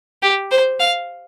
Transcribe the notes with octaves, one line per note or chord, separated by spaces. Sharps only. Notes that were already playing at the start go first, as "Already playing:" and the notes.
G4
C5
F5